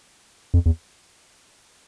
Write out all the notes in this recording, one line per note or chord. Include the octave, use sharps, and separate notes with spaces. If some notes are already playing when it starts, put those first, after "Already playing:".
F2
E2